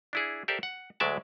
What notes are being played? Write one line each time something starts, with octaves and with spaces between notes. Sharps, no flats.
D4 E4 G#4
G4 A4 A#4 C5 D5 E5
F#5
D2 F#3 G#3 D5 E5 A5